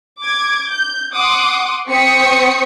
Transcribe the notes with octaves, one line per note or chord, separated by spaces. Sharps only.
D6 G#6
G6
F#5 C6 D6 D#6
C4 C5 C#6 D#6 B6 C#7